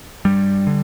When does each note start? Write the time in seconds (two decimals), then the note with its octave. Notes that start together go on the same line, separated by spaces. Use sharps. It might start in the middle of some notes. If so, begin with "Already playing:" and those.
0.25 G2 G3
0.67 D3